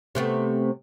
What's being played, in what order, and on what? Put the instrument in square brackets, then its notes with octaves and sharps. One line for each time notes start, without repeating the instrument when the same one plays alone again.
[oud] C3 A3 B3